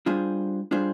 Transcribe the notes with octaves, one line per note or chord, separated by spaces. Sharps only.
G3 D4 F4 G#4 C5
G3 D4 F4 G#4 C5